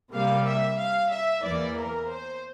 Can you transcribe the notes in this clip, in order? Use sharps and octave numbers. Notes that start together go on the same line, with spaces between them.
C3 G3 A#3 F5
E5
F5
E5
E2 E3 A#3 D5
A#4
C5